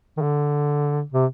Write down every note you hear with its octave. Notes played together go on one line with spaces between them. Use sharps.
D#3
D3
C3